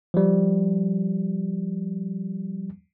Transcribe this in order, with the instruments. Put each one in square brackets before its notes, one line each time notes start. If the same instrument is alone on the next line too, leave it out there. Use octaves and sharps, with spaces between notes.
[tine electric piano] F3 G3